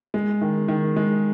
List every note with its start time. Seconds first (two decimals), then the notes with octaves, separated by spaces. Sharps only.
0.14 G#3
0.41 D#3
0.68 D#3
0.96 G#3